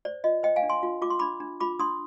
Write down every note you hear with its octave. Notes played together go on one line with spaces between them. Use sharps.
C5 D5
F4 D#5
C5 D#5 G5
F5 G#5
D4
G#5 C6
F4
F4 D6
C6
D4 B5 D6
D4
F4 B5 D6
D4 C6 D#6